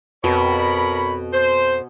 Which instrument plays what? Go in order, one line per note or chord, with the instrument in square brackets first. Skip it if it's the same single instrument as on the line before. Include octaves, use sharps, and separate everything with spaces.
[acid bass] F2 [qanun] B2 [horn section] A#4 C#5 B5
[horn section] C5